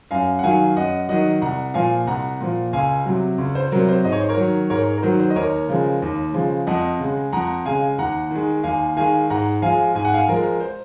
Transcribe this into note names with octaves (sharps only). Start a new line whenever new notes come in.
F#2 F5 G#5
F#5
D#3 F#3 F5 G#5
F#2 D#5 F#5
D#3 F#3 D#5 F#5
C2 F#5 A#5
A#2 F3 F5 G#5
C2 F#5 A#5
A#2 F3
C#2 F5 G#5
C3 F#3
C#2
C5
C3 F#3 A#4
C5
G#2 D#5
C#5
C5
A#4 C#5
D#3 F#3
G#2 A#4 C#5
A#4
D#3 F#3 C5
C5
D#5
D#2 A#4 C#5
C#3 F3 G#3
D#2
C#3 F3 G#3
F2 D#5 F#5
C#3 G#3
F2 F#5 A#5
C#3 G#3 F5 G#5
D#2 F#5 A#5
D#3 G#3
D#2 F5 G#5
D#3 G#3 F5 G#5
G#2 F#5 A#5
F3 G#3 F5 G#5
G#2 G#5
F#5
F5 G#5
F3 G#3 A#4
C5